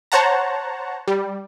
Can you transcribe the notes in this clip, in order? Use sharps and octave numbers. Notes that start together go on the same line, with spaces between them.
C5 C#5 F#5 A5 A#5
G3